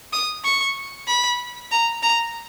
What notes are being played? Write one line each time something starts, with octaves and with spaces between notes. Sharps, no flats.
D#6
C#6
B5
A#5
A#5